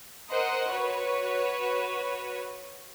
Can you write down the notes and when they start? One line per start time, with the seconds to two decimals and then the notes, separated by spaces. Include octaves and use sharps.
0.30 A#4 C5 D#5 F#5
0.70 F#4 B4 C#5